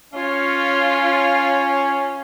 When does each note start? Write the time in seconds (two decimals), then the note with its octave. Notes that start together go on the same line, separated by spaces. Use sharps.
0.14 C#4 F4 C#5